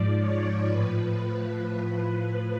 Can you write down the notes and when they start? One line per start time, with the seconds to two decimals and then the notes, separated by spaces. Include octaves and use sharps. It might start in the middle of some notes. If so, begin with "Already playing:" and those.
Already playing: G#2 F3 D5
0.19 C#5
0.69 A2 F3 B4